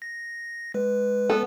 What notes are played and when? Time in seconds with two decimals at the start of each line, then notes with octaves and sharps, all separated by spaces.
0.02 A#6
0.74 G#3 B4
1.30 B3 A4